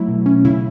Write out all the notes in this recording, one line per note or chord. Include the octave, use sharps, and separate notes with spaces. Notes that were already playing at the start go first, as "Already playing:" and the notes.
Already playing: F#3 A3 E4
B2
C#4
C#3 E4